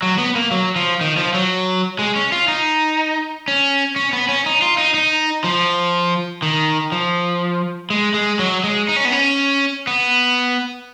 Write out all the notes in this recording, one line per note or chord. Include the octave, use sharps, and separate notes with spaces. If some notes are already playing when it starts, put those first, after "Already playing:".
F#3
B3
A#3
F#3
F3
D#3
F3
F#3
G#3
C#4
F4
D#4
C#4
C#4
B3
C#4
D#4
F4
D#4
D#4
F3
D#3
F3
G#3
G#3
F#3
G#3
D#4
C#4
B3
C#4
B3